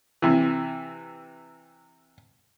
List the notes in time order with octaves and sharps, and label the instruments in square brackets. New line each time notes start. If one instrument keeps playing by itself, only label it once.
[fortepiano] C3 E3